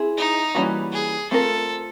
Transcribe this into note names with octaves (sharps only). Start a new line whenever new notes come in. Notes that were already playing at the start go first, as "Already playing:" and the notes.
Already playing: C4 E4 G#4
D#4
E3 G3 A#3 C#4 F#4
G#4
A3 C4 F4 A4 A#4